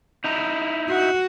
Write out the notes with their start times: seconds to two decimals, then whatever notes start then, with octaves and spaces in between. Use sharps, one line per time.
0.24 D#4 E4 A#5
0.89 F#4